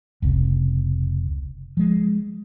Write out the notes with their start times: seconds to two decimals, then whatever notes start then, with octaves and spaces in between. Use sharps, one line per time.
0.22 F1 C#2 C3
1.77 F3 G#3